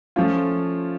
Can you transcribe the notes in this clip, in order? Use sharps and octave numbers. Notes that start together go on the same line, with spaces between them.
F3 A3 C#4 F4